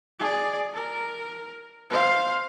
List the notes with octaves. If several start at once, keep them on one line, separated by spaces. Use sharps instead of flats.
G#4 D5
A#4
C5 F5